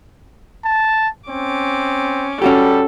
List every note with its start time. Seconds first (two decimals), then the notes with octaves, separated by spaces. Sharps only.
0.65 A5
1.29 C4 C#4 D6
2.42 G3 C#4 F#4 G4 A4